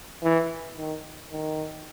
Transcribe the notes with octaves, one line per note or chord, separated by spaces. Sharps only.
E3
D#3
D#3